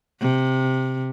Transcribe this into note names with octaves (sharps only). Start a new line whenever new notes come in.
C3